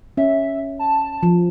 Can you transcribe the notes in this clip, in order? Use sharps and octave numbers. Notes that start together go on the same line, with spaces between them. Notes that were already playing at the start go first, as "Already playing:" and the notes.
C#4 E5
A5
F3